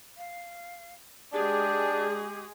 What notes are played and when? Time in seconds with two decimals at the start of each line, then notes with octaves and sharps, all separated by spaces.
0.17 F5
1.33 G#3 D4 G4 G#4